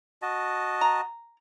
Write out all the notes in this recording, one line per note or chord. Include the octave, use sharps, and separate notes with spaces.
F#4 D#5 A5
A#5